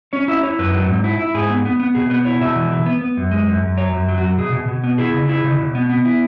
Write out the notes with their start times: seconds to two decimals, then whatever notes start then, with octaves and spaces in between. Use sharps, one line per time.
0.13 C#4 C#5
0.28 E4 E5
0.43 E4 C#5
0.59 F#2 B4
0.75 F#3
0.89 G#2
1.04 E4
1.19 E4
1.34 G#2 G#4
1.50 B3
1.65 B3
1.80 B3
1.95 B2 G#4
2.10 B3 B4
2.25 E4 C#5
2.41 B2 E5
2.56 E3
2.72 E3
2.86 B3
3.01 B3
3.17 F#2
3.31 G#3
3.47 F#2
3.62 F#2
3.77 F#3 C#5
3.93 F#2
4.08 F#3
4.18 F#4
4.22 F#2
4.38 B2 G#4
4.53 B2
4.68 B2
4.84 B3
4.98 E4 G#4
5.14 C#3
5.29 E4
5.44 C#3
5.59 B2
5.75 B3
5.89 B3
6.05 E4